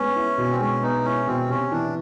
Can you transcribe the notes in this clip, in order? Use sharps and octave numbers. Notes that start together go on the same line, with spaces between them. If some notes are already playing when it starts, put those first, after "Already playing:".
Already playing: G#3 B3 C#4
E4
B2
C4
G#3 C#4
B3 D#4
C#4 E4
B2 C4
C3 C#4
E3 D4